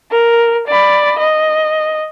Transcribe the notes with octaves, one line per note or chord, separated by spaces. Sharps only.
A#4
D5 B5
D#5